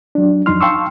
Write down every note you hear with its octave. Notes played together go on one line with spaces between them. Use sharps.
F#3 D4
F2 F#3 D#4 C6 F6
F5 G5 A5 C6 C#6 E6